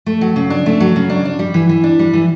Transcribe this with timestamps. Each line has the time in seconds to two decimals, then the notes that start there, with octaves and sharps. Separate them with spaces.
0.06 A3
0.21 F#3
0.36 C#3
0.50 D4
0.66 A3
0.80 F#3
0.96 C#3
1.10 D4
1.25 D4
1.39 G3
1.54 E3
1.69 E3
1.84 D4
1.99 G3
2.13 E3